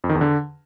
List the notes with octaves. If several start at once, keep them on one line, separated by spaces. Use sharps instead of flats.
F2
D#3
E2
D3